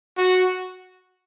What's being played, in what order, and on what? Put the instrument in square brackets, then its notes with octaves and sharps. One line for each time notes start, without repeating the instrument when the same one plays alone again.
[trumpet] F#4